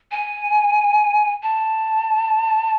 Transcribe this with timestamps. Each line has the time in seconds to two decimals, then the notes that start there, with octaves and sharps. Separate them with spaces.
0.12 G#5
1.43 A5